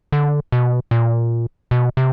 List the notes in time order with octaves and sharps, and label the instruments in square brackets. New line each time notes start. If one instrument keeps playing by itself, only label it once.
[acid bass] D3
B2
A#2
B2
C3